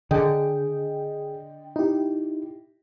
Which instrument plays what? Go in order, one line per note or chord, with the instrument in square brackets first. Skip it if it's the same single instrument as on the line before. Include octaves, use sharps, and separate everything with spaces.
[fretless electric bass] D3 [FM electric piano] D4 D#5 G5 [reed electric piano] G#4
[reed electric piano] D#4 [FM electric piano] E4 G4